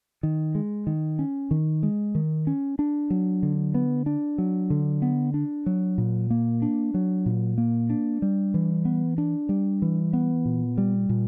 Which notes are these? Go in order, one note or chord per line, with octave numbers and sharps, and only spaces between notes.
D#3
G#3
D#3
C#4
D#3
G#3
D#3
C#4
D4
F#3
D3
B3
D4
F#3
D3
B3
D4
F#3
A#2
A#3
D4
F#3
A#2
A#3
D4
G3
E3
B3
D4
G3
E3
B3
A#2
G3
A#2